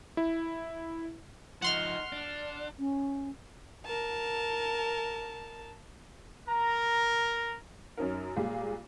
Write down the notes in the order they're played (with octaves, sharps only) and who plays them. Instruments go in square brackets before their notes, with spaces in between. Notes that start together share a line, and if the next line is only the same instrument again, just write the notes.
[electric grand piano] E4
[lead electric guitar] F3 D#4 [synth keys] F#5 C6 F6
[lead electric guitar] D4
[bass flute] C#4
[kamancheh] A#4 A5
[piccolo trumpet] A#4 [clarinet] A#5
[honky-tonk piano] F#2 C#4 D#4 A#4
A#2 G3 G#3 F4 G4